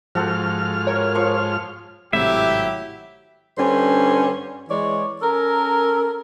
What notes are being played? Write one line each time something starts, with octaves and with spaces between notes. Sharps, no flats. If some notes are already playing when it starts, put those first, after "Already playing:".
G#2 F3 F4 F#4 A4 C5 F6
A#4 C#5
F3 C6 C#6
G#1 A2 C3 F#3 E4 G4 E5
G2 D3 C#4 C5
E3 G#3 C#5 D5
C#4 A4 A#4